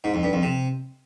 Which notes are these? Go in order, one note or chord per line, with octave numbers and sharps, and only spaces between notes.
G#2
F2
G2
F2
C3